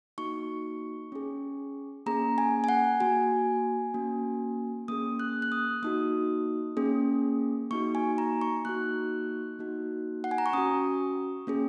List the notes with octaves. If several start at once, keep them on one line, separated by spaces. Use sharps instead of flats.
A#3 D#4 F#4 C#6
C#4 G#4
A#3 C#4 G#4 A#5
G#5
G#5
F#5
A#3 F#4 G#5
A#3 C#4 F#4
A#3 C#4 G#4 D#6
F#6
F#6
D#6
A#3 D#4 F#4 D#6
A#3 C#4 G#4
A#3 D#4 F#4 C#6
G#5
A#5
C#6
A#3 D#4 F#4 F#6
A#3 D#4 F#4
F#5
G#5
A#5
C#6
C#4 F#4 D#6
A#3 C#4 G#4